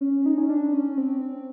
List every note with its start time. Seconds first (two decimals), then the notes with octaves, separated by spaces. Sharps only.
0.01 C#4
0.26 D#4
0.38 C#4
0.49 D4
0.73 C#4
0.97 C4
1.21 C4